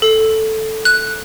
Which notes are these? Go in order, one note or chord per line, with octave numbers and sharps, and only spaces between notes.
A4
F#6